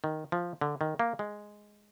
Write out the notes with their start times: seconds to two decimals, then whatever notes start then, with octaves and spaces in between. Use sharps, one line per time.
0.04 D#3
0.32 F3
0.61 D3
0.81 D#3
0.99 A#3
1.19 G#3